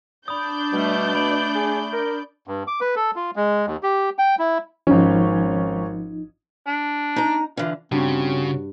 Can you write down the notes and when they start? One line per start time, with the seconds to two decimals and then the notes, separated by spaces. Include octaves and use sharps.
0.28 D4 D5 B5 D#6 G6
0.73 B2 G3 A3
1.15 A3 B5 D7 F#7
1.55 G#4
1.93 A#4
2.47 G2
2.67 D6
2.81 B4
2.96 A4
3.16 F4
3.36 G#3
3.67 D#2
3.83 G4
4.19 G5
4.39 E4
4.87 G#1 F3 C#4 D#4
6.67 D4
7.16 D#4 A#5
7.57 D3 E3 F4
7.92 G2 C#3 C4 F#4